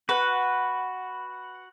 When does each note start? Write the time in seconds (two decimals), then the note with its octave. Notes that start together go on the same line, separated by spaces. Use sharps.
0.09 F#4 B4 F#5